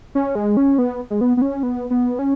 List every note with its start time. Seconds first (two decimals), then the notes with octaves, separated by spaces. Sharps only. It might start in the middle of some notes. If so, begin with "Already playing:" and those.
0.15 C#4
0.35 G#3
0.57 C#4
0.78 B3
1.10 G#3
1.21 B3
1.37 B3
1.42 C#4
1.63 B3
1.90 B3
2.19 C#4